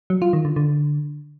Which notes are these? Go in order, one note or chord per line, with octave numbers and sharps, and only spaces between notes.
F#3
F4
D#3
D3
D3